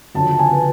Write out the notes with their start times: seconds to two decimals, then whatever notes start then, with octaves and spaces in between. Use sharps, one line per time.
0.15 D2 C#3 F3 A5
0.34 A5
0.39 G#5
0.52 B4